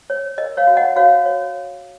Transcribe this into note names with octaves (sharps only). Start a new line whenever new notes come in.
C#5
A#4 D#5
C#5 F5
F#4
D#5 F#5
F#4 C#5 F5
C#5